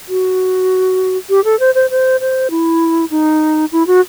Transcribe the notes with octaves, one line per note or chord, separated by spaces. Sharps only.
F#4
G4
A4
C5
C5
C5
C5
E4
D#4
E4
F#4